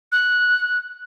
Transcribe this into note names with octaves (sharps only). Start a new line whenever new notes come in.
F#6